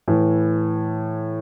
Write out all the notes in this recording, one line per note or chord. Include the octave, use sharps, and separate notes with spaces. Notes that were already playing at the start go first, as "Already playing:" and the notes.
A2 E3